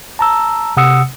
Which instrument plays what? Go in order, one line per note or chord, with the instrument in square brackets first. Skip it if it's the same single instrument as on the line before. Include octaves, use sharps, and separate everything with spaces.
[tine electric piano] A5 A#5 E6
C3 F#5 D#6 E6 C#7